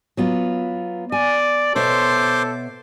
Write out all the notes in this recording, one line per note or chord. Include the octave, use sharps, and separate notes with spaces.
F#3 B3 F4
D5 G#5
B2 A4 C5 C#5 E5 C6 D6